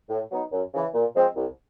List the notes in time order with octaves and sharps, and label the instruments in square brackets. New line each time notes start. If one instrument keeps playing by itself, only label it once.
[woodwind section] A2
F#3 B3 D#4
F#2
C#3 E3
A#2
F3 G#3 C4
C2